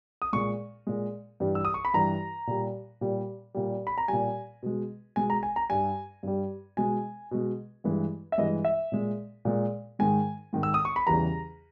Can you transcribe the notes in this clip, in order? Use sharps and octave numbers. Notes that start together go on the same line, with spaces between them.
D#6
A#2 G#3 C#6
A#2 G#3
G2 E3 G3
E6
D#6
C#6
B5
G2 E3 G3 A#5
A#2 G3
A#2 G3
A#2 G3
B5
A#5
A#2 G3 G#5
B2 G#3
B2 G#3 G#5
A#5
G#5
A#5
G2 G3 G#5
G2 G3
B2 G#3 G#5
B2 G#3
G2 E3 G#3
E5
G2 E3 G#3 D#5
E5
A#2 G#3
A#2 G#3
G#2 D#3 G#3 G#5
G#2 D#3 G#3
E6
D#6
C#6
B5
E2 C#3 E3 G3 A#5